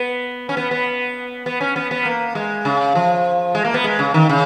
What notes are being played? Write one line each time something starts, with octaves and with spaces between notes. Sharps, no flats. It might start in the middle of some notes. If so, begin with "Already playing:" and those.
Already playing: B3
C#4
B3
B3
B3
C#4
B3
B3
A#3
G#3
C#3
F3
G#3
A#3
B3
G#3
C#3
D#3
C#3